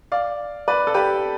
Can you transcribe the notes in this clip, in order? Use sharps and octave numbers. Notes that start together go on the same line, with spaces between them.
D5 F5
B4 D5
A4
G4 B4